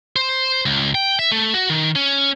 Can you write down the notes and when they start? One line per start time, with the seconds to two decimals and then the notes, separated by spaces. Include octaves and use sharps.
0.16 C5
0.66 C#2
0.95 G5
1.19 E5
1.31 A3
1.54 F#4
1.70 D#3
1.96 C#4